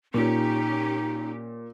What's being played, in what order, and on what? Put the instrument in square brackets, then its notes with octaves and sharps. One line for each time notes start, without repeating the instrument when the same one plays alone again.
[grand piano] A#2 [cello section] C#4 G4 [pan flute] D#4